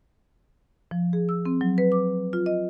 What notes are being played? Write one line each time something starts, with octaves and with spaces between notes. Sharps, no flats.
F3
G#4
E6
C4
F#3
B4
D6
F4
D#5